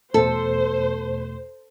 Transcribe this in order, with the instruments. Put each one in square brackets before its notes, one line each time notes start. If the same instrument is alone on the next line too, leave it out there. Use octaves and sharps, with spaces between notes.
[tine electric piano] E2 B2 A3 [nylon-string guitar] A4 [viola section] C5